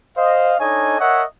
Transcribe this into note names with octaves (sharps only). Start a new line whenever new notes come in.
C5 D#5 F5
D4 D#4 A4 C#5 D#5 G#5
A#4 C#5 D#5 E5 F#5